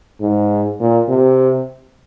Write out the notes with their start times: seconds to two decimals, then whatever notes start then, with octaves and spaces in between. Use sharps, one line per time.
0.21 G#2
0.80 A#2
1.09 C3